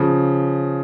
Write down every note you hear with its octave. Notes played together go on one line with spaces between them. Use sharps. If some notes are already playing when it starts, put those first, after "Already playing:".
Already playing: C#3 F3